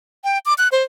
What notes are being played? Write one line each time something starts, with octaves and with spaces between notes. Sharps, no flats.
G5
D6
F#6
C5